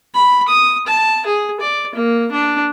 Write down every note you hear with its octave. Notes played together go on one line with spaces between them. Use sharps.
B5
D#6
A5
G#4
D5
A#3
D4